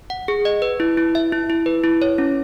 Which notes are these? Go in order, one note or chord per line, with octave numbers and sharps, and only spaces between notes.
F#5
G#4
D#5
B4
E4
E4
E5
E4
E4
B4
E4
C#5
C#4